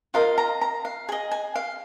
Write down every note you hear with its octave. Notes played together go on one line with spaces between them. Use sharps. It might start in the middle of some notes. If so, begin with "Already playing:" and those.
F4 A#4 D#5 F5
A#5
A#5
F5
G#4 D#5 G#5
G#5
F5